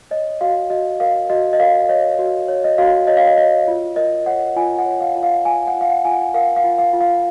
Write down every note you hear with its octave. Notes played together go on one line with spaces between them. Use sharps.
C#5 D#5
F#4 F5
F#4 D#5
A#4 F5
F#4 D#5
D#5
A#4 F5
C#5 D#5
F#4
C#5
D#5
F#4 F5
C#5 D#5
F5
D#5
C#5 D#5
F4
A#4 D#5
C#5 F#5
F4 G#5
F#5
C#5
F5
F4
F5
F4 G#5
F#5
F4
F5
F#5
F4 G#5
F#5
A#4 F5
F5
F4
F5
F4
F5